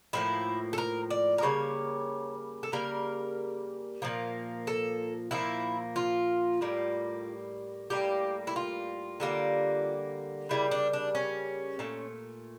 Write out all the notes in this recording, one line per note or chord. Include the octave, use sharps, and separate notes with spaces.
A2 F3 A#3 E4
A4
A#4
D5
A#4
C#3 G3 A#3 C#5
A4
C#3 G3 A#3 A#4
A#2 F3 A#3
A4
A#2 F3 A#3 E4
F4
A2 G3 A#3
A2 G3 A#3 G4
E4
F4
D3 G3 A#3
C#3 G3 A#3 E4
D4
D4
C#4
A#2 A3